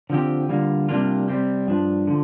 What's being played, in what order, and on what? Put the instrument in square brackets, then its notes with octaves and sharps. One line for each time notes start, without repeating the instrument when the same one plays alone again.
[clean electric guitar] D3 F3 C4 G4
D3 G3 A#3 F4
C3 G3 A#3 D4 F4
C3 G3 C4 G4
G2 F3 D4
D3 F3